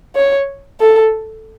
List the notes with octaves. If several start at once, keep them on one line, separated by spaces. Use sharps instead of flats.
C#5
A4